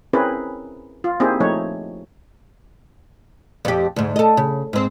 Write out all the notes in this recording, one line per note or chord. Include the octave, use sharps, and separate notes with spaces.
C4 C#4 E4 G#4 A#4 B4
F4
A#3 C4 D#4 E4 G4 G#4
F3 A3 D#4 C#5
F2 G4
D2 G#2
A4 D#5
C#3
G#2 C4